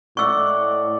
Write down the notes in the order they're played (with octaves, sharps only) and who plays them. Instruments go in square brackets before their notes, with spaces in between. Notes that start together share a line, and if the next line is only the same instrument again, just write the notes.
[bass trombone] A2 [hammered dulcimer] D5 D#5 F#5 [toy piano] C#6 E6